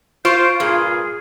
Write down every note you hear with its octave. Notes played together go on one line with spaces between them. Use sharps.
F4 C5 C6 C#6 G6 D7
G2 A#2 G#4 F6